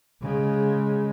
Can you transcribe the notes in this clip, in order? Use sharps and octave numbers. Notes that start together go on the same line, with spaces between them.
C#3 G#3